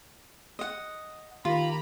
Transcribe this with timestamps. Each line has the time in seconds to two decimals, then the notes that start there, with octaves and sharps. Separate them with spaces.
0.59 D#5 F#5
1.45 D#3 A#3 F4 G4 A#5 B5